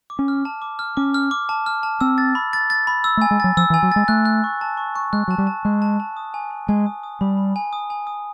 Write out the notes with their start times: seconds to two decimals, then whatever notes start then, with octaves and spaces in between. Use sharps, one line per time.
0.10 D6
0.19 C#4
0.28 F6
0.45 A5
0.62 D6
0.79 F6
0.97 C#4 D6
1.14 F6
1.31 D6
1.49 A5
1.66 F6
1.83 A5
2.01 C4 E6
2.18 A6
2.35 B5
2.53 A6
2.70 A6
2.87 B5
3.04 E6
3.17 A3
3.22 G#5
3.31 G#3
3.40 F#3 A6
3.57 F3 E6
3.70 E3
3.74 G#5
3.83 F#3
3.92 G#3 A6
4.08 A3 F#6
4.25 F#6
4.44 C#6
4.61 A5
4.77 C#6
4.96 C#6
5.13 G#3 F#6
5.28 F#3 A5
5.38 G3
5.47 A5
5.65 G#3 F#6
5.82 A5
6.00 A5
6.17 D#6
6.34 G#5
6.51 G#5
6.68 G#3 G#5
6.86 D#6
7.03 D#6
7.21 G3 B5
7.37 B5
7.56 G#5
7.73 D#6
7.90 G#5
8.07 D#6